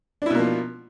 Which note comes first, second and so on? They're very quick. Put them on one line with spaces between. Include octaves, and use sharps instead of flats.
D4 E4 B2 A#3 F3